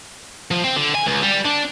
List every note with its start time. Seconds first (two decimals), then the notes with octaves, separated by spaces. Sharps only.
0.51 F3
0.64 C4
0.76 D3
0.95 G#5
1.06 C#2
1.22 G3
1.45 D4